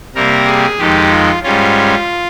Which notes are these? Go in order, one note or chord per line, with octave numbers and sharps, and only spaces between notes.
C3 G3 A#3 A#4
G#4
F2 D#3 G#3 G4
F4
G#2 G3 C#4 F4